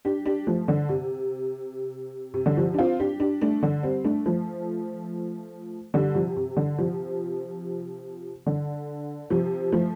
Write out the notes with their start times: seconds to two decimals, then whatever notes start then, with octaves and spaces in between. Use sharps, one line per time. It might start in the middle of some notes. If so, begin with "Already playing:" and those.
0.05 D4 G4
0.26 D4 G4
0.47 F3 A3
0.68 D3
0.89 C3
2.34 C3
2.46 D3
2.57 C3 F3
2.74 D4
2.78 C4 F4
3.00 D4 G4
3.20 D4 G4
3.41 A3 D4
3.63 D3
3.83 G3 C4
4.04 A3 D4
4.26 F3 A3
5.94 D3 G3
6.15 C3 F3
6.37 C3
6.57 D3
6.78 C3 F3
8.46 D3
9.30 C3 F3
9.72 F3 A3